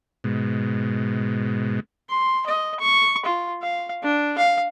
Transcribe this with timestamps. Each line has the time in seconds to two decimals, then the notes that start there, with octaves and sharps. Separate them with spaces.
0.24 G#2 B2
2.10 C6
2.47 D#5
2.80 C#6
3.25 F4
3.62 F5
4.03 D4
4.38 F5